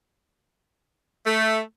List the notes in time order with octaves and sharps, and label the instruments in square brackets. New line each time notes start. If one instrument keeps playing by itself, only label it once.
[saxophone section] A3